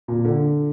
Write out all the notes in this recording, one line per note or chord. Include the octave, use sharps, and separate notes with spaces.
A#2
D3